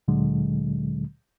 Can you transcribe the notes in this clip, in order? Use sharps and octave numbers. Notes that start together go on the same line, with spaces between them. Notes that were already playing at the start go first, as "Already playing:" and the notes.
D2 A#2 D3 F#3 G#3